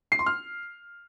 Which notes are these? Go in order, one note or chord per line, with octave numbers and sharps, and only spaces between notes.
C7
C6
F6